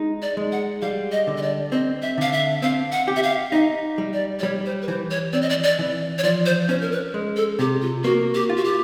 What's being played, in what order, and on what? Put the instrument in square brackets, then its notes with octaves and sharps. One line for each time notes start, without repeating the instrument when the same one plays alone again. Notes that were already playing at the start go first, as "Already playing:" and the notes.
Already playing: [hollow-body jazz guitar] G#3 D#4
[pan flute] D5
[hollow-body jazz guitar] G#3
[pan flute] F#5
[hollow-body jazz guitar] G3 [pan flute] F5
[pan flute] D#5
[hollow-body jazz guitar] D3
[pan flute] D#5
D5
[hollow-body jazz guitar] C4 [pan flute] D#5
[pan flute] E5
[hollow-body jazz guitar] D3 [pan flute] F5
[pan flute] E5
[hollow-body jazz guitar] C4 [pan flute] F5
[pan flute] F#5
[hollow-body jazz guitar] G4
[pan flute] E5
F5
[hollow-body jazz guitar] D#4 [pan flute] E5
[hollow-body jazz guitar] G3
[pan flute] D5
D5
[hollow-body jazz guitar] G3 [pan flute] C#5
[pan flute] C5
B4
[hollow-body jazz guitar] E3 [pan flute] C5
[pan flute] C#5
[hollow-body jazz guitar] C4 [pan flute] D5
[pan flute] D#5
D5
D5
[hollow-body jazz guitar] E3
[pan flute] C#5
[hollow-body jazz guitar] F3 [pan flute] D5
[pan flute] C5
[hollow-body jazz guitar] C#4 [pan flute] C5
[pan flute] A#4
B4
[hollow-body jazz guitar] G#3
[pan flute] A4
[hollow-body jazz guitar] C3 [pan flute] G4
[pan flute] F4
[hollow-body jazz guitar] A#3 [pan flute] F#4
[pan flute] G4
[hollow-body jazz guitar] F4
[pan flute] F#4
G4